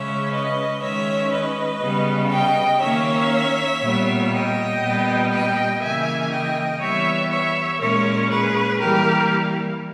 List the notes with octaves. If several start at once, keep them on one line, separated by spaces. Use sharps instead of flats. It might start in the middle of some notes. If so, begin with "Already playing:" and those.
Already playing: C#3 G#3 C#4 C#5 E5
B4 D#5
D#3 G#3 C#4 C#5 E5
B4 D#5
C#3 G3 B3
D#5 G5
D#3 A#3 C#4 C#5 E5
A#2 G3 B3
D#5 G5
A#2 G3 B3
D#5 G5
C#3 E3 A#3 E5 G#5
D#5 G5
E3 G3 B3 C#5 E5
C#5 E5
A#2 G#3 C#4 A#4 C#5
G#4 B4
E3 G3 A#3 G4 A#4